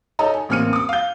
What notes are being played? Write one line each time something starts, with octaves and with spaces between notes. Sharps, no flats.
D#4 A4 C#5 D#5 A#5
G#5
A1 A#3 C4 F6 C#7 D#7
D6 D#6
F5 G6